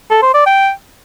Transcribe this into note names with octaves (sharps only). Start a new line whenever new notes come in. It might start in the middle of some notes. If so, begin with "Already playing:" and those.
A4
C5
D5
G5